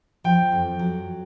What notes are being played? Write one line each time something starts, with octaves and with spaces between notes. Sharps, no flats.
F3 G5
F2
F#3